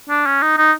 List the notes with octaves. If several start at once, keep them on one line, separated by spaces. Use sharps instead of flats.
D4
C#4
D#4
D#4